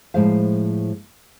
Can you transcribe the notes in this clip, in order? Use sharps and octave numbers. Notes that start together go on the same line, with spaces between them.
A2 F3 G#3 C5 F5